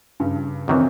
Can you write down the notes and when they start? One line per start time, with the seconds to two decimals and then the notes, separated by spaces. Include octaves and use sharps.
0.20 G2 C#3
0.68 F#2 D#3 E3 C4